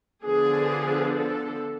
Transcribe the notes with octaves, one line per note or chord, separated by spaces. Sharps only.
D3 F3 B3 D4 G#4
A4